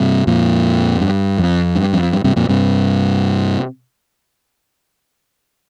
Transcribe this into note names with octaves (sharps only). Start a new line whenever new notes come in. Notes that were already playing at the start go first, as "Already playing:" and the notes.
Already playing: G2 C3
F2 A#2
G2
F2
G2
F2
G2
G2 C3
F2 A#2
G2 C3